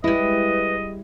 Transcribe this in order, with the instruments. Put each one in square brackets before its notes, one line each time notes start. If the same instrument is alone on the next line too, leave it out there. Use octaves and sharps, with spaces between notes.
[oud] G3 G#3 [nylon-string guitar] E4 [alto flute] B4 [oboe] D#5